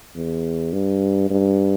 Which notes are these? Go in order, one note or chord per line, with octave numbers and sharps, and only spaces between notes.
E2
G2
G2